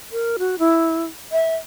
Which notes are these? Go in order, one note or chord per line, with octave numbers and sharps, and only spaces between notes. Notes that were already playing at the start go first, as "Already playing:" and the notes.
A#4
F#4
E4
E5